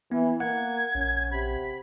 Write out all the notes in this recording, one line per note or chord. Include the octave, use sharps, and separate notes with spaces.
E3 B3
A#3 F#5 G#6
A#1 C#4
C3 B5